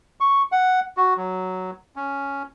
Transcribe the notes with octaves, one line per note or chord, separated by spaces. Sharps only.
C#6
F#5
F#4
F#3
C#4